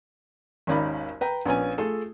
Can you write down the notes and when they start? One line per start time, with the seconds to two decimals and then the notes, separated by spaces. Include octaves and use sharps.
0.67 G#1 D#2 C#4 D#4 D5 B5
1.21 B4 G5 A#5
1.46 A#1 B3 C#4 G#5
1.78 A3 F4 G#4 A4